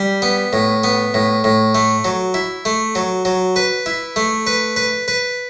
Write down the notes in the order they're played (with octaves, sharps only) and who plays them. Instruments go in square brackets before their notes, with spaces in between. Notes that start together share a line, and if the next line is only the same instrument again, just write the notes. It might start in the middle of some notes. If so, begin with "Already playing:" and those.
Already playing: [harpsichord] G3
B3
A2
B3
A2
A2
A3
F#3
E4
A3
F#3
F#3
B4
E4
A3
B4
B4
B4